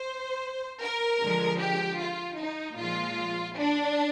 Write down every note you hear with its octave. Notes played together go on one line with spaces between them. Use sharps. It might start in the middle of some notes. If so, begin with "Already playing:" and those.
Already playing: C5
A#4
D3 F3 G#3
G4
F4
D#4
A#2 F3 G#3 F4
D4